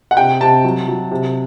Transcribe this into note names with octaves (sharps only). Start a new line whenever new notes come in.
F#5
C3 G5
C3 A5
F#3
F#3
C3